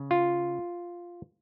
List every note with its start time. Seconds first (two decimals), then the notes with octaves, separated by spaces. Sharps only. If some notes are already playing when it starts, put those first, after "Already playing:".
Already playing: C#3
0.11 F4